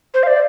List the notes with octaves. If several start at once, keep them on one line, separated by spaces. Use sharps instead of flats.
C5
F5
D5